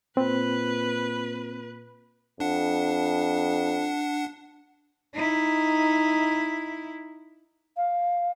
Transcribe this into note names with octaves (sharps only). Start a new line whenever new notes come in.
A#2 C4 B4
F2 D4 F#5
D#4 E4
F5